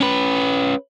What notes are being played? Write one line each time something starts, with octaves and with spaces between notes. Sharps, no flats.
C#4 B4